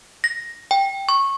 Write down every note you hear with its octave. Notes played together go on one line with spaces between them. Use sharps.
A#6
G5
C#6